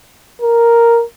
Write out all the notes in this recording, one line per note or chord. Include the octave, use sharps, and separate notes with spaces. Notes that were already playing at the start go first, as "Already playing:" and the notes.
A#4